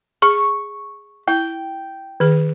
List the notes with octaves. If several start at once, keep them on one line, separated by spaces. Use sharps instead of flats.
G#4 C#6
E4 G5
D#3 G#4